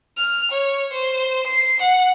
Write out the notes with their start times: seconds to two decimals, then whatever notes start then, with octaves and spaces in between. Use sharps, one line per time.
0.18 F6
0.52 C#5
0.93 C5
1.47 C7
1.80 F#5